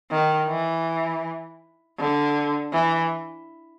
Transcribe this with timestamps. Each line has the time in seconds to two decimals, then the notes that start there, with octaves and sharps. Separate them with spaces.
0.11 D#3
0.48 E3
1.99 D3
2.73 E3